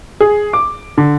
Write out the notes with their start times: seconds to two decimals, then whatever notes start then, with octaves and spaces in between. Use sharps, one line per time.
0.20 G#4
0.53 D6
0.98 D3